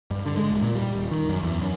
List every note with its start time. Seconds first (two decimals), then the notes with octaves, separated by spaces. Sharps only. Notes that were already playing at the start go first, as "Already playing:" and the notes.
0.11 G2
0.26 D3
0.37 G#3
0.51 D#1
0.63 A#2
0.75 G3
0.95 D#1
1.11 D#3
1.29 F#2
1.43 E2
1.61 F#2